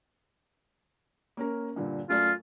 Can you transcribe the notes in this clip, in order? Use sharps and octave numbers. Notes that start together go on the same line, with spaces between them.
A#3 C#4 A#4
G2 A#2 D3
F#2 A3 F4 D5